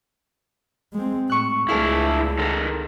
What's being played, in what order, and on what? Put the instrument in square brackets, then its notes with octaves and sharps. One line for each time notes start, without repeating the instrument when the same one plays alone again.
[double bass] G#3 C4
[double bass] A2 [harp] C#6 E6 F#6
[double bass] C#2 [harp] A3 G#4 F5 [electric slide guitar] D4 E4
[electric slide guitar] D#3 A4 A#4